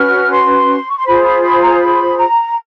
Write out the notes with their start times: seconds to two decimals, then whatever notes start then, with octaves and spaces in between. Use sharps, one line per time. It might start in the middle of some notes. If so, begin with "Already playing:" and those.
Already playing: C#4 F#4 B4 F6
0.31 C6
0.89 C#6
0.97 C6
1.05 F4 G#4 C5 B5
1.23 B5
1.42 B5
1.61 A#5
1.78 B5
2.16 A#5